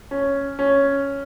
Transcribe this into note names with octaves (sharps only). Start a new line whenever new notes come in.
C#4
C#4